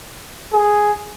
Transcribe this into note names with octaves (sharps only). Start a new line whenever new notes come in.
G#4